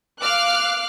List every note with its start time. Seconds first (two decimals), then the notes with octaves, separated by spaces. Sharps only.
0.20 F5 D6 F6 F#6